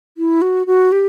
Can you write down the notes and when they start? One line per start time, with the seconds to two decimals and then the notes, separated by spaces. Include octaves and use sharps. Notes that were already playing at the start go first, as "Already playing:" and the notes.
0.18 E4
0.42 F#4
0.67 F#4
0.92 G4